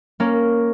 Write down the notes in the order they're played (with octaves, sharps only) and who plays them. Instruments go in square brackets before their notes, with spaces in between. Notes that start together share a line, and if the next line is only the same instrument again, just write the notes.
[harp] A#3 C#4